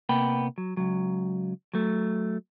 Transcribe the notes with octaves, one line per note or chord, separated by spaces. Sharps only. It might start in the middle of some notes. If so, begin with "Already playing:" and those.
C3 A#3 B3 G5 B5
F#3
C#2 F#3
F#3 A3